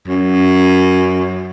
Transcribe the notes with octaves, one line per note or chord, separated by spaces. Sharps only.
F#2